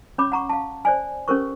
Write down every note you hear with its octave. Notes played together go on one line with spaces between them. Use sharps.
C#4 C#5 B5 D6
F#5 A#5 C#6
F5 A5
C5 D5 G#5
C#4 G4 A4 A#4 C5 C#6